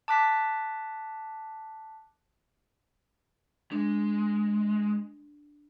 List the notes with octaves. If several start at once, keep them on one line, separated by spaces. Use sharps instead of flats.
A5 D6 F#6 B6
G#3 D4